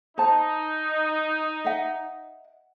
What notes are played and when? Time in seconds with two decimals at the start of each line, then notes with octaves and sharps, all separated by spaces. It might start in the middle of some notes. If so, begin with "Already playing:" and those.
0.18 D#4 C5 A5
1.65 D#5 E5 F#5